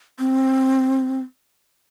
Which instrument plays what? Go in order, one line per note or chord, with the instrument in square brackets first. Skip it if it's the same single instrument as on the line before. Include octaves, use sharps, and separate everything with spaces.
[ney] C4